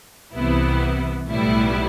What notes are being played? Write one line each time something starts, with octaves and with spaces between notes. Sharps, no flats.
C2 C3 E3 B3 E4
B1 A2 G3 B3 E4